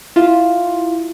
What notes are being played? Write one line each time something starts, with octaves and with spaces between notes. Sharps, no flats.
E4 F4